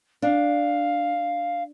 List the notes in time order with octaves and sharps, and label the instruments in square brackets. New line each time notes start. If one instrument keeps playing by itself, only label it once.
[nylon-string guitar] D4 [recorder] F5